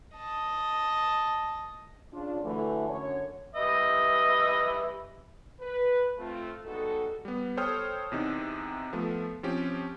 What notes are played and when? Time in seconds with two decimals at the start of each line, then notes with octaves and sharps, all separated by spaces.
0.16 D#5 A5
2.13 C#3 D4 F4
2.43 D3 E3 F#3 A3
2.89 F#2 D3 C#4 C#5
3.55 G3 B4 D#5 E5
5.60 B4
6.18 A3 C4 F4
6.65 G3 G#3 B3 D#4 F#4 A4
7.25 G3 B3
7.57 A4 C5 C#5 G5 D#6 F6
8.12 E2 C3 D#4
8.93 F3 A3 B3
9.43 F3 C4 C#4 G4